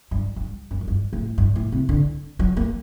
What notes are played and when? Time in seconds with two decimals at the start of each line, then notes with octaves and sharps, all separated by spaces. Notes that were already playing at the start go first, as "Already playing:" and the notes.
0.11 G2
0.36 G2
0.71 F#2
0.81 F#2
0.88 G2
1.13 A2
1.38 G2
1.56 A2
1.72 C3
1.89 D3
2.39 F#3
2.57 A#3